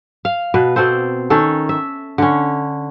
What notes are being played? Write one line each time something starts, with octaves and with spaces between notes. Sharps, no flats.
F5
B2 B4
B2 C4 A4 C5
D#3 C#4 A4
E5
D3 C#4